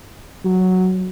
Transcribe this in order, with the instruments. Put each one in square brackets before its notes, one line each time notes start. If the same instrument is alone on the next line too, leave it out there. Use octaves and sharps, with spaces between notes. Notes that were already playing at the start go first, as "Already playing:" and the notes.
[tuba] F#3